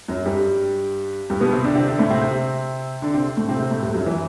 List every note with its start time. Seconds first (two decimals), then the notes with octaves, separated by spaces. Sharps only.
0.08 F#2 F#3
0.26 G2 G3
1.30 G2 G3
1.41 B2 B3
1.53 C3 C4
1.64 D3 D4
1.75 C3 C4
1.87 D3 D4
1.99 A2 A3
2.10 C3 C4
2.22 C3 C4
3.02 D3 D4
3.14 C3 C4
3.37 A2 A3
3.49 C3 C4
3.60 C3 C4
3.71 A2 A3
3.83 G2 G3
3.95 F#2 F#3
4.06 E3